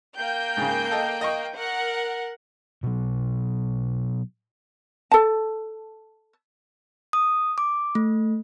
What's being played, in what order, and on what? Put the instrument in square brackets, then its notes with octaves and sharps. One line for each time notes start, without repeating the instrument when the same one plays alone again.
[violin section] A#3 G5 G6
[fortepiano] G#2 C#3
A4 D#5
D#5 C#6
[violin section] A#4 F#5
[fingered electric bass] B2 F#3
[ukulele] A4 A5
[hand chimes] D#6
D6
A3